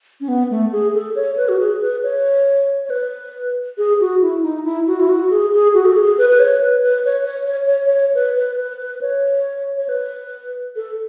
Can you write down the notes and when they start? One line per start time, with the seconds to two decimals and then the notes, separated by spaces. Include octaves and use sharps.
0.21 C#4
0.28 B3
0.50 A3
0.72 G#4
0.94 A4
1.16 C#5
1.37 B4
1.49 F#4
1.60 G#4
1.81 B4
2.03 C#5
2.85 C#5
2.90 B4
3.78 G#4
4.00 F#4
4.21 E4
4.43 D#4
4.65 E4
4.87 F#4
5.00 E4
5.09 F#4
5.30 G#4
5.53 G#4
5.74 F#4
5.85 A4
5.96 G#4
6.18 B4
6.30 B4
6.39 C#5
6.61 B4
6.83 B4
7.05 C#5
7.25 C#5
7.46 C#5
7.66 C#5
7.86 C#5
8.15 B4
8.36 B4
8.58 B4
8.80 B4
9.01 C#5
9.77 C#5
9.89 B4
10.76 A4